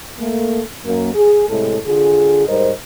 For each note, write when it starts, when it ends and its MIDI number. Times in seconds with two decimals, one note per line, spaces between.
0.19 0.61 57
0.19 0.61 58
0.85 1.10 42
0.85 1.10 58
1.14 1.46 68
1.49 1.77 45
1.49 1.77 48
1.49 1.77 56
1.49 1.77 69
1.86 2.44 50
1.86 2.44 65
1.86 2.44 68
2.48 2.71 44
2.48 2.71 55
2.48 2.71 70
2.48 2.71 72
2.48 2.71 75